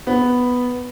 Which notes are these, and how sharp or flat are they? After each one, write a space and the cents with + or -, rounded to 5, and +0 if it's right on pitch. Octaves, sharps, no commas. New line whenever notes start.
B3 +0 B4 +0